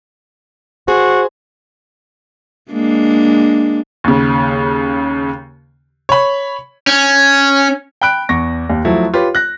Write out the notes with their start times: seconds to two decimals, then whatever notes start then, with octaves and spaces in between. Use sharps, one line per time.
0.88 F#4 G#4 C5
2.72 G#3 A#3 D4
4.04 D#2 C#3
6.09 C#5 B5
6.87 C#4
8.01 G5 B5 F#6 D7
8.29 E2 C#6 A#6
8.70 D#2
8.85 F3 F#3 A3 E4
9.14 F4 G4 B4 C#5
9.35 F#6 A#6